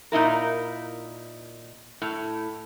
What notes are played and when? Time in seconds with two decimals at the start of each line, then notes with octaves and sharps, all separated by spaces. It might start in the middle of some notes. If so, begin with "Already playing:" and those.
0.12 A#2 D#4 E4 A#4
2.02 A2